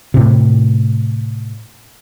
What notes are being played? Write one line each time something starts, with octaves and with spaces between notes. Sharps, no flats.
A2 C3